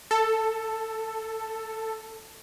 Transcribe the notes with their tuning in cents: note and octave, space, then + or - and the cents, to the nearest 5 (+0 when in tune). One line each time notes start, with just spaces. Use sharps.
A4 +10